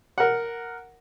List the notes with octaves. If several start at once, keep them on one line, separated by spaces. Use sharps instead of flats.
A#4 F#5